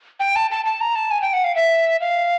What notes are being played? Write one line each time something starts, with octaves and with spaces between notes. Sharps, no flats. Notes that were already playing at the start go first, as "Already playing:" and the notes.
G5
A5
A5
A5
A#5
A5
G#5
G5
F#5
F5
E5
F5